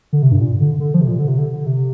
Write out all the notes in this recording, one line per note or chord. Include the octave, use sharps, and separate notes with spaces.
D3
C3
G2
A#2
D3
D3
F3
C3
A#2
D3
C3
D3
D3
C3